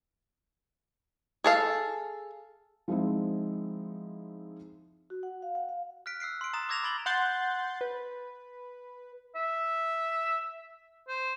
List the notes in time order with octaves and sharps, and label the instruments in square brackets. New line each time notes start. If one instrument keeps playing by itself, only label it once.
[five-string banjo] G#4 A4 F5
[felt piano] F3 G#3 C4 D#4 E4
[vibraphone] F#4
F#5
F5
F#5
F5
[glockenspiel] F6 F#6 B6 D7
E6 F#6 C7 D7
C6 D7
A#5 D#6 A6 E7
D6 E6 G#6 A#6 E7 F7
B5 G#6 A6 D7 F#7 G7
[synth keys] F#5 C6 F#6 G6 A6
B4
[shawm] E5
C5